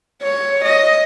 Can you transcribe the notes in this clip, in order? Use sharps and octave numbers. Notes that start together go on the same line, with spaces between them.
C#5
D#5